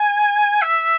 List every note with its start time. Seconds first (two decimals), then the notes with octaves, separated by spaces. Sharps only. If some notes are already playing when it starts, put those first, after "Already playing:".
Already playing: G#5
0.62 E5